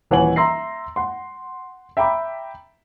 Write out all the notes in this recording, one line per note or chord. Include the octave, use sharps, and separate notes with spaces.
D#1 E3 C#5 F#5 G#5 F#7
E5 A#5 C6 E6 A#6 C7
F#5 C6
E5 G5 A#5 B5 D6